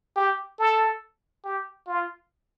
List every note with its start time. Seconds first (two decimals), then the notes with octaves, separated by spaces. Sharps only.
0.16 G4
0.59 A4
1.44 G4
1.87 F4